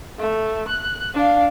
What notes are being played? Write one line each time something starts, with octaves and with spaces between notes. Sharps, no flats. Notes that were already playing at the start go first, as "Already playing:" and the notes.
A3
F#6
D4 F5